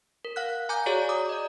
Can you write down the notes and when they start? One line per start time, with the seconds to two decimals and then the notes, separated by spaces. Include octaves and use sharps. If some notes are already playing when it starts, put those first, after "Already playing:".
0.25 A#4
0.36 F5 F#5 F6 F#6
0.69 F5 G#5 A#5 D6 G6
0.86 F#4 G#4 C#5 D5 A#5
1.09 A#5 D6 D#6
1.29 D5 D#5